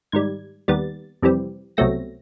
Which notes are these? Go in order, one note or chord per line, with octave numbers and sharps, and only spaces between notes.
G#2 D#3 G3 G#6
D#2 D#3 G3 B3 A6
F2 C3 E3 G3 C4
C2 B2 F#3 A3 C4 A#6